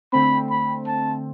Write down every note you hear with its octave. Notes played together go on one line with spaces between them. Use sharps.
D3 A3 C4 B5
B5
A5